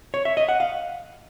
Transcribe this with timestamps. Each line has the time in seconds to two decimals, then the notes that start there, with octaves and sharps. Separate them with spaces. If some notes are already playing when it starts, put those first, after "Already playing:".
0.14 C#5
0.25 E5
0.37 D#5
0.49 F#5
0.60 F5